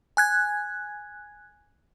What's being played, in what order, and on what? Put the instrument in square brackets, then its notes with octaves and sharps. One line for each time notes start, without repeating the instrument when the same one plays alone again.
[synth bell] G#5 F#6 G#6